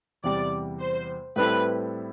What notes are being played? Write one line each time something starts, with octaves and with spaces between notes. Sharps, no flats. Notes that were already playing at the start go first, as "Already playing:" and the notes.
E2 C3 G3 D5
C5
A2 G3 C4 E4 A4 B4